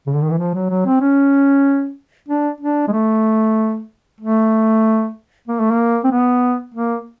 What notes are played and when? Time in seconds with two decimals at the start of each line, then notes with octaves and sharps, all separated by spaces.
0.07 C#3
0.14 D3
0.23 D#3
0.30 E3
0.39 F3
0.54 F#3
0.70 F#3
0.86 C4
1.01 C#4
2.28 D4
2.61 D4
2.88 G#3
2.92 A3
4.21 A3
5.48 A#3
5.60 A3
5.71 A#3
6.04 C4
6.11 B3
6.75 A#3